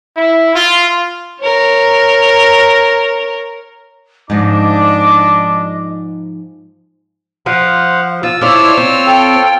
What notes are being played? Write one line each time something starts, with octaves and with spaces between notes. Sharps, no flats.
E4
F4
A#4 C#5
G#2 F3 D4 D#5 D6
F3 C5 F5 F#5
F3 F4 E6
D4 E4 F4 C5 C#5 F6
C4
A4 G5